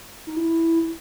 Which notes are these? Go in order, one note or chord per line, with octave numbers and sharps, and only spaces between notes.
D#4
E4